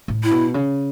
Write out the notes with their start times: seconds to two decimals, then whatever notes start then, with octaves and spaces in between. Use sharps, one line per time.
0.08 A2
0.24 E4
0.31 B2
0.54 C#3